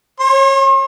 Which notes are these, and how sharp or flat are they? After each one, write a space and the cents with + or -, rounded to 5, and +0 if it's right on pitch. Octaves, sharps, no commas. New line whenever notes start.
C#5 -25 C6 +45